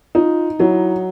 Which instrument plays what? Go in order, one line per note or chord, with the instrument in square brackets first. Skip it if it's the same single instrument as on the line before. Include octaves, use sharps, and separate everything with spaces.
[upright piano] D#4 [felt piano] F4
[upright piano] F#3 [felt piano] E4